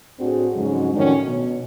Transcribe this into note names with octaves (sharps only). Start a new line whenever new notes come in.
A2 C4 D4 F#4 G#4
F2 G#2 C#3 F#3 G#3 C#4
A2 D#3 F3 C#4 D4 F#4
B2